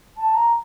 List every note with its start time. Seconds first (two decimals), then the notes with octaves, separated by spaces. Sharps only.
0.17 A5
0.35 A#5